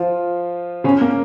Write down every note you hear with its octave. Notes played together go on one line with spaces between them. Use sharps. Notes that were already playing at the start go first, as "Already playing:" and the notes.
Already playing: F3 F4
C#3 C#4
A#3